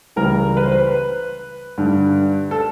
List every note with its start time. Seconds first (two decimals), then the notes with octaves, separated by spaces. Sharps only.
0.16 C#2 C#3 E3 G3 A#4
0.57 B4
0.64 C5
0.72 B4
1.78 G2 D3 G3
2.51 A4